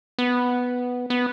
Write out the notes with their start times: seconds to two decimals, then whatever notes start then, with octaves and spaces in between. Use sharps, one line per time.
0.19 B3
1.10 B3